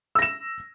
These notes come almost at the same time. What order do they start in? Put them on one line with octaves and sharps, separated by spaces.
E6 A#6 E7